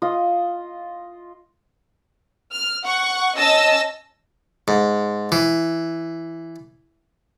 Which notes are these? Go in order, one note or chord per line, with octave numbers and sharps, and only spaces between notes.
F4 D#5
F6
F#5 C#6
C#4 D#5 A5 E6 A#6
G#2
E3